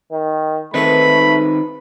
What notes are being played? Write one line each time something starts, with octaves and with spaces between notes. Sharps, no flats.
D#3
D#3 A3 C4 D#4 B4 B5